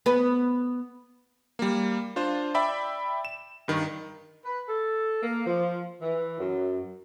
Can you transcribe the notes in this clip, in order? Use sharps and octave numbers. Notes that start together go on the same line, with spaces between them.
B3 B4
G3 A#3
D4 F4 C5
D5 E5 G5 B5
E7
G2 D#3
B4
A4
A#3
F3
E3
F#2